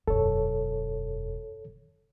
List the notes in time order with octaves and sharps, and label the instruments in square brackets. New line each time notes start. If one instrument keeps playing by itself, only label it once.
[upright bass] E1 F#2 [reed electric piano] A4 C#5